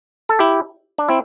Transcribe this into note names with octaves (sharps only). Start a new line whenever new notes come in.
A4
E4 G4
D4
C4 E4